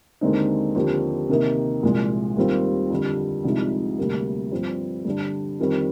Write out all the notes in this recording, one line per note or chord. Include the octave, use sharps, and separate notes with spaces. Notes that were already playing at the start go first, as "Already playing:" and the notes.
D#2 D3 G#3 C4 D#4
D#2 D3 F3 C4 G4
C3 D#3 A#3 D#4
C2 A#2 F3 G#3
D#2 D#3 G3 C4 F4
F2 D3 G3
C2 C3 F3 G#3 D#4
D2 C3 G3 A#3
G2 F3 C4
G2 D3 G3 D4
F2 D#3 G3 C4